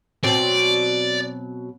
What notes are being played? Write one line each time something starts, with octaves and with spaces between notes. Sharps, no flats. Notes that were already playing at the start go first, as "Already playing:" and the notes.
B2 F#3 C4 D5